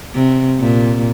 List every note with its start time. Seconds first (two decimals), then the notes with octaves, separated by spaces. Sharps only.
0.15 C3
0.60 A#2